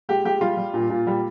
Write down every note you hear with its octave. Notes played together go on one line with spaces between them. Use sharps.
G#3 G4
G#3 G4
G3 F4
G3
A#2
A#2
G3